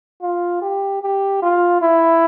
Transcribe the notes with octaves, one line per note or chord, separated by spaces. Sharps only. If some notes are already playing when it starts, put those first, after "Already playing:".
F4
G4
G4
F4
E4